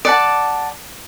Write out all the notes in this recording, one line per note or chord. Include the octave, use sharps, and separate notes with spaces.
D5 F#5 A5